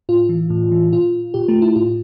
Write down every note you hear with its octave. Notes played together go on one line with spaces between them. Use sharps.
A2 F4
E3
A2
E3
A#2 F4
A#2 G4
A3
E4
A2 F4